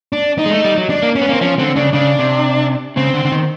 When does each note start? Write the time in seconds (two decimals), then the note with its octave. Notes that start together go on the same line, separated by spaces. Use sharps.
0.13 D4
0.38 D#4
0.46 G#3
0.51 A3
0.65 G3
0.77 F#3
0.90 D4
1.03 A#3
1.16 C#4
1.21 B3
1.29 A#3
1.33 C4
1.41 F3 C#4
1.59 D3 C4
1.76 C#3 D4
1.93 C#3 D4
2.19 C3
2.96 C#3 C4
3.14 D3
3.25 D3
3.32 D#3